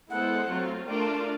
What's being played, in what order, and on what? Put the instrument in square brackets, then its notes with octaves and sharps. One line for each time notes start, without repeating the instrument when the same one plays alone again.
[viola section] G#3 B3 E4 A4 C5 [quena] F#5
[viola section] F#3 A3 C4 F4
[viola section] A3 D4 F4 A#4 D5 [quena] G5
[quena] A5
A5